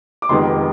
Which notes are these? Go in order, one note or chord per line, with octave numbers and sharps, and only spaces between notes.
D6
F1 F2 D#3 G#3 B3 C6